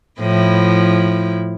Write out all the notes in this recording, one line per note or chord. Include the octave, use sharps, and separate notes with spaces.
A2 F3 E4